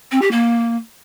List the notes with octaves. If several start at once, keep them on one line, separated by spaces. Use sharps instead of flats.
C4
G4
A#3